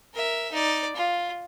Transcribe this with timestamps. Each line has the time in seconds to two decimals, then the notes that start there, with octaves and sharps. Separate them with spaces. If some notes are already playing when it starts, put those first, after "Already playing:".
0.14 A#4 E5
0.52 D#4 D5
0.96 F4